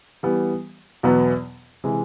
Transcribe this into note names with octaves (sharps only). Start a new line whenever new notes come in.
E3 G3 B3
E2 B2 F#3 B3
C3 E3 G#3